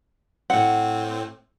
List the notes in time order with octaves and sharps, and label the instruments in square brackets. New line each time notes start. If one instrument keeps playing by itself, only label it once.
[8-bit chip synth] A2 C4 [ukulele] F#5